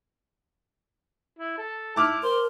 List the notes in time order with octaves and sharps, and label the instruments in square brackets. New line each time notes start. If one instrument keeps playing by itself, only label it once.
[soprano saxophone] E4
A4
[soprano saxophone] E4 [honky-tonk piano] A5 D6 F6
[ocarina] A#4 [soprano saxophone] C5